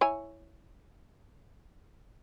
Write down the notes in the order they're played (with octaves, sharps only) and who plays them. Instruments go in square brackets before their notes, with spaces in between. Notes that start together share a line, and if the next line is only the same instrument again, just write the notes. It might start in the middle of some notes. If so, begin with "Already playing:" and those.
[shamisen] E4 C#5 G#5